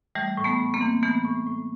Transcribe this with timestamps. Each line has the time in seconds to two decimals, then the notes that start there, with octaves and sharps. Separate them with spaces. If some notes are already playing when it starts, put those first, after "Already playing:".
0.15 E3 G3 A3
0.37 A2
0.44 A3 B3
0.59 A2
0.74 A#3 C4
0.81 E3
1.03 E3 A3 B3
1.25 A2
1.46 A2